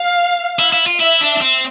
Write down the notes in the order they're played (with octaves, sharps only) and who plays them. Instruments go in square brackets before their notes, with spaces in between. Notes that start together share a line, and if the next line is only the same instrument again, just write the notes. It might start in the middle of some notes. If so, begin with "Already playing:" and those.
Already playing: [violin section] F5
[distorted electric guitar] E4
E4
F4
[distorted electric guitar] E4 [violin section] E5
[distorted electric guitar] D4
D4
C4